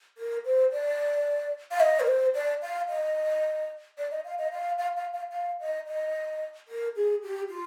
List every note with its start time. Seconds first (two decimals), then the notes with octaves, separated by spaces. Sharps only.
0.18 A#4
0.45 C5
0.72 D5
1.71 F5
1.80 D#5
2.00 A#4
2.07 C5
2.34 D5
2.62 F5
2.89 D#5
3.98 D5
4.11 D#5
4.24 F5
4.38 D#5
4.52 F5
4.78 F5
4.97 F5
5.14 F5
5.32 F5
5.60 D#5
5.87 D#5
6.68 A#4
6.96 G#4
7.23 G4
7.50 F4